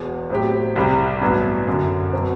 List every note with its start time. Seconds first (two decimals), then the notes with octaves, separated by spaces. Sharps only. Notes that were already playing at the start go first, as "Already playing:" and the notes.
Already playing: E1 E2 B2
0.30 A2 F#3 C4 G4
0.76 C2 C3 G3
1.21 A1 G2 F#3 B3 D4
1.67 F#2 D3 F#3
2.13 B2 F#3 C4 F#4